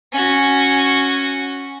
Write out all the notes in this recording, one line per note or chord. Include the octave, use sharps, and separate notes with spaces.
C#4 F#4